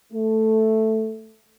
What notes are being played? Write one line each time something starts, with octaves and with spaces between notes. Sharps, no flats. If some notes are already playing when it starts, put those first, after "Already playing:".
A3